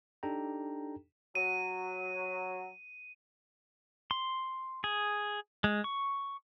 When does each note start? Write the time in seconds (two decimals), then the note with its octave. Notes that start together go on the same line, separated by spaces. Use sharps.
0.23 D4 D#4 G4 A4 G5 A#5
1.35 F#3 D#7
4.11 C6
4.84 G#4
5.64 G#3
5.84 C#6